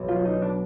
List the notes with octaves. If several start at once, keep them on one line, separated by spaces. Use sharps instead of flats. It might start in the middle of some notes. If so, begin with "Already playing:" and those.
Already playing: B1
F4
F#3
D#4
B3
D4